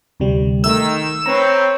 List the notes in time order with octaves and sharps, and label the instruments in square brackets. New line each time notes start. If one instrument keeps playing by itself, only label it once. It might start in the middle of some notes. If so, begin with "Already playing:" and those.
[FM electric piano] D2 C3 G3
[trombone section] D#3 [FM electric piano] A3 [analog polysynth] E6
[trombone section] C4 [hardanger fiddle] B4 C#5 [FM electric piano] A#5